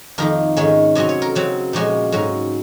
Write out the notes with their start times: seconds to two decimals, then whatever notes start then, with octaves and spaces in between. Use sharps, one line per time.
0.18 F2 D#3 A#3 A#4
0.57 G#2 D#3 G#3 C#4
0.95 C3 F#3 C#4 D#5
1.09 C#5
1.22 A#4
1.35 C#3 F#3 C4
1.73 A#2 F3 G#3 C#4 F#4
2.12 G#2 F#3 C#4